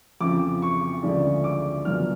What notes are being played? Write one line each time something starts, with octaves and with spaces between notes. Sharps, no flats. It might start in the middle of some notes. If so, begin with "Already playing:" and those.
F2 C#3 F3 D6
C#6
D2 C#3 F3 G#3 D4
D6
F#2 C#3 F3 B3 D4 F6